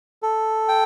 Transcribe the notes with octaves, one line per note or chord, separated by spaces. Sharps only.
A4
G5